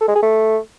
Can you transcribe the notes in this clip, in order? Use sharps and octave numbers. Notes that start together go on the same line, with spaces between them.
A4
G#3
G#4
A3